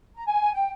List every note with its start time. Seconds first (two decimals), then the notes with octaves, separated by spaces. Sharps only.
0.16 A#5
0.26 G#5
0.54 G5